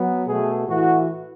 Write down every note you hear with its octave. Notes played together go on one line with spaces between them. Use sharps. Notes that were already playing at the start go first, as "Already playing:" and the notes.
Already playing: F#3 B3
B2 A3 G#4
A2 E3 A3 F#4